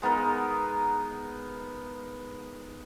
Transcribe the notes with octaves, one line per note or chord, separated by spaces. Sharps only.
G#3 B3 D#4 A#4